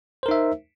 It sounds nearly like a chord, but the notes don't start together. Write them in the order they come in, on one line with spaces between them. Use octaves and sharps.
C5 A#4 D#4 E5